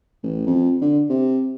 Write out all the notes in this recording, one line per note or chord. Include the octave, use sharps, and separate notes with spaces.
A1
F2
D3
C3